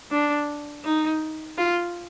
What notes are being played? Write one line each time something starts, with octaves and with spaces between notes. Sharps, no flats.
D4
D#4
F4